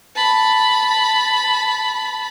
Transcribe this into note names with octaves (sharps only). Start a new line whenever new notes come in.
A5 B5